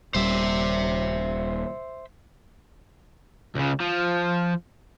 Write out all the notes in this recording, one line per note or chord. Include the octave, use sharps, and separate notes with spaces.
D#1 G3 C5 E5
C#2 C#3
F3